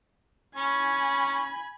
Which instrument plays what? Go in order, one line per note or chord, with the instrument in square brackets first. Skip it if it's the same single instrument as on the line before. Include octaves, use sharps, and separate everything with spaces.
[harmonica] C#4 [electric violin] G#5 B5